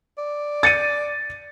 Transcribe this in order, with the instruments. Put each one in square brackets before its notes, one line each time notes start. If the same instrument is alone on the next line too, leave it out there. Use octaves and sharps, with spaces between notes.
[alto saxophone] D5
[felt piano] A6 C#7 D#7